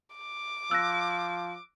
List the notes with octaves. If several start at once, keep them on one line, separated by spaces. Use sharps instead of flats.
D6
F3 E6 F#6 A#6